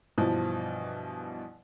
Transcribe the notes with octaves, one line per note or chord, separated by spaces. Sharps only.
G2 B2 E3 F3